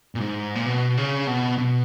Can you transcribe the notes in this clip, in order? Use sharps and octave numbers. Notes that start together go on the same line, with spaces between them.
A#2
G#2
A#2
B2
C#3
B2
B2